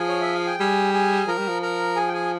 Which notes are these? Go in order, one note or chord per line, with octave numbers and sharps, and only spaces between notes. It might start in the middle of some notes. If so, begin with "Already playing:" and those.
Already playing: F3 G#4 G#5
C#5
E5
F5
G5
G3 G#4 G#5
G#4 G#5
F3 A#4 A#5
G3
F3
A#4 A#5
G#4 G#5
G5
G#4 G#5